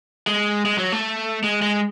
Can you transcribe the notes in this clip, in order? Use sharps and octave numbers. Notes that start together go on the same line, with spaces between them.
G#3
G#3
F#3
A3
G#3
G#3